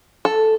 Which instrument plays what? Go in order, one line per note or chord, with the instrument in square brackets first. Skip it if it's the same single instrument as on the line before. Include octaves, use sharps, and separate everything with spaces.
[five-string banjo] A4